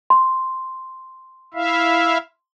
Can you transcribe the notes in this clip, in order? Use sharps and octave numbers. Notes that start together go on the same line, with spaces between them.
C6
E4 E5 F5